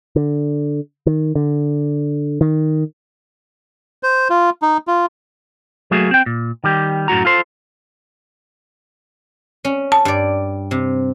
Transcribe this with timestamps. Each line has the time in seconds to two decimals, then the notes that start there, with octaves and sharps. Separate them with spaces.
0.16 D3
1.06 D#3
1.35 D3
2.41 D#3
4.03 C5
4.30 F4
4.62 D#4
4.87 F4
5.91 F#3 A3 A#3 F#4 G#4
6.11 C4 G5
6.26 A#2
6.64 D#3 G3 G4
7.08 F#2 A2 F#4 A#5
7.25 F4 A4 C5
9.65 C#4
9.92 A5
10.05 G2 D5
10.71 C3